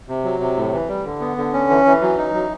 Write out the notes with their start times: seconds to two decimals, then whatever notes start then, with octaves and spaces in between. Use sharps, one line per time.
0.08 C3
0.24 F#3
0.40 C3
0.57 A2
0.72 E3
0.89 G3
1.05 D3
1.21 B3
1.37 D3
1.53 C#4
1.70 E3
1.86 E3
2.02 F#3
2.18 D#4
2.34 F#3